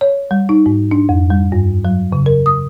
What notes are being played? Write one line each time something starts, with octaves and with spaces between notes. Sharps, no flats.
C#5
G3
D#4
G#2
D4
F2
G3
G2
F#3
C#3
A#4
D#6